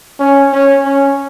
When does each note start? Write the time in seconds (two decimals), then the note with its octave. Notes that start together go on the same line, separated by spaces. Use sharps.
0.19 C#4
0.52 C#4
0.85 C#4